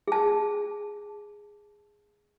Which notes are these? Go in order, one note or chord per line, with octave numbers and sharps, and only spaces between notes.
G#4 A5